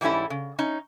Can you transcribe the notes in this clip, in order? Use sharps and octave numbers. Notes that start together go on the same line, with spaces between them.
G#2 E3 G3 C#4 E4 A4
C#3
C#4 D#4